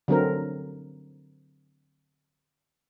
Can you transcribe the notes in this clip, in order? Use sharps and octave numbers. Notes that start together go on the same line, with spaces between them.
D3 F#3 C4 A#4